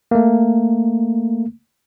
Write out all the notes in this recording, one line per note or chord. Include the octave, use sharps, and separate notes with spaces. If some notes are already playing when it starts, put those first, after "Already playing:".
A3 A#3